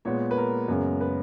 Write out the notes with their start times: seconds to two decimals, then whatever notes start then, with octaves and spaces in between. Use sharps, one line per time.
0.05 A#2 G#3 B3 C#5
0.31 B4
0.38 A#4
0.68 F#2 C#3 G#3 B3
1.01 B4